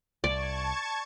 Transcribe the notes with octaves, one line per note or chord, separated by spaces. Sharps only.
C2 D5 A5 C#6 G#6